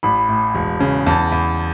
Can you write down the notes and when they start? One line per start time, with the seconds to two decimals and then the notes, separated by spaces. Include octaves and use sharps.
0.03 A1 B5
0.29 A2
0.55 E1
0.80 C#3
1.06 E2 A5
1.32 E2